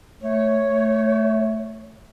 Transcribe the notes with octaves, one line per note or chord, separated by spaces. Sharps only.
A3 C#5
A3